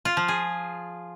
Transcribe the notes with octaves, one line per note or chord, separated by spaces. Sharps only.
F4
F3
G#4